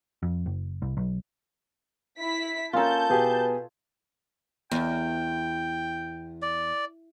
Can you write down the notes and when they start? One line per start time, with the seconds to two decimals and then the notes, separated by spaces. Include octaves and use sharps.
0.23 F2
0.46 F#1
0.82 C2
0.97 B1
2.20 E4 B6
2.73 A#3 C#4 F4 A4 A5 A#5 G6
3.10 B2 G4 G#4 B4
4.71 E2 G5
6.42 D5